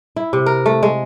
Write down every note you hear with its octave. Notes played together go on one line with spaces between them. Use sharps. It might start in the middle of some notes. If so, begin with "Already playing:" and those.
E4
C3
A#4
A3
G#3